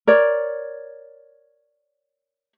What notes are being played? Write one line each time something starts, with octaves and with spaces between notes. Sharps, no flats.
A#4 C#5 D5